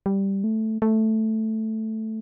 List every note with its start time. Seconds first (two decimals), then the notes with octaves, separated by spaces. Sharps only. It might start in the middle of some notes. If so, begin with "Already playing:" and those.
0.06 G3
0.44 A3
0.82 A3